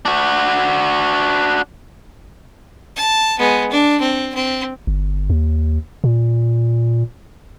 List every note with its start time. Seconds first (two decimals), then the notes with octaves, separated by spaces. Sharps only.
0.05 D4 F#4
2.96 A5
3.39 G#3 B3
3.71 D4
4.00 C4
4.34 C4
4.87 G1
5.30 D#2
6.04 A#2